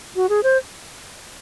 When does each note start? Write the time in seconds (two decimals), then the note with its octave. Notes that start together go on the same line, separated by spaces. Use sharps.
0.16 F#4
0.29 G#4
0.43 C5